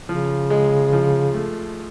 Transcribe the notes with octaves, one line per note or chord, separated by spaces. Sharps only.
C#3 F3
G#3
F3
A3